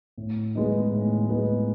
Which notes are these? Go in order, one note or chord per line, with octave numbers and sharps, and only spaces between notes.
A2
G#3 B3 D#4
A2
G#3 B3 D#4